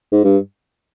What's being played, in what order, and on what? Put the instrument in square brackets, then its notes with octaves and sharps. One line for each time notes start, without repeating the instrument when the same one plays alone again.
[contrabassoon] G#2
G2